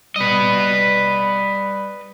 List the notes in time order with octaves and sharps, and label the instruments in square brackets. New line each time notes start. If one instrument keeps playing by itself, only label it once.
[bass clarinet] G3 [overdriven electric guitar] B4 D#5